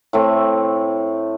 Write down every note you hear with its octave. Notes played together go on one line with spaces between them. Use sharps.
A2 A3 C4